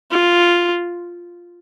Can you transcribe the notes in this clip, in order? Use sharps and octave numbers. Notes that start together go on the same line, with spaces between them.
F4